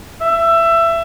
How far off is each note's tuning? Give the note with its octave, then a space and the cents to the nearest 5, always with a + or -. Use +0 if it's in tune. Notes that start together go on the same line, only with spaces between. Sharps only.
E5 +20